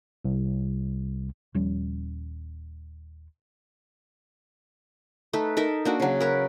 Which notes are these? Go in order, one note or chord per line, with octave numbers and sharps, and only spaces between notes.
C2
D#1 F3 G3 C#4
A3 D#4 A4 B4
D#4 A4 A#4 E5
A#3 D4 F#4
C#3 F#3
A#4 B4 C#5